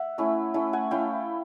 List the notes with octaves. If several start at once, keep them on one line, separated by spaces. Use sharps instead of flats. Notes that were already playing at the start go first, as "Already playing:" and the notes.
Already playing: E5 F#5
A3 C#4 E4
A3 C#4 E4
F#5 G#5
A3 C#4 E4 F5 G5